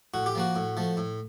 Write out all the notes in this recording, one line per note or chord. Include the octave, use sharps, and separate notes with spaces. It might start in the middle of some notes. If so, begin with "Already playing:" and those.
A2 F#4
G4
F3 A#3 F#4
A2
F3 A3
A2